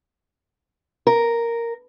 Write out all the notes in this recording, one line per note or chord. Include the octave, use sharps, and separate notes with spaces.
A#4